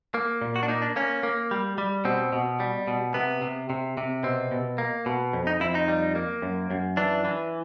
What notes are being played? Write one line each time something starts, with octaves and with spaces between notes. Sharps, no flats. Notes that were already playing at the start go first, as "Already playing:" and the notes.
A#3
A#2
F#4
D4
A#3 D#4
D4
A#3 C#4
A#3
G3
G3
B2 C4
B2
G3
B2
C3 B3
C3
C3
C3
B2 C4
B2
A#3
B2
F2
D#4
F2 E4
D#4
G3
A#3
F#2
F#2
E3 D4
E3